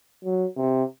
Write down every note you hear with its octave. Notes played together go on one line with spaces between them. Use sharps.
F#3
C3